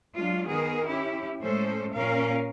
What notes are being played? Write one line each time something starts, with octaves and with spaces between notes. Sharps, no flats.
F#3 G#3 D4 F4
D#3 B3 G#4 A#4
C#4 E4 G4
A2 G#3 C#4 A4 C5
A#2 A#3 C#4 A#4 F5